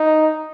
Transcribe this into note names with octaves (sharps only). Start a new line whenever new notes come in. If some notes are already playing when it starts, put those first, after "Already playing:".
Already playing: D#4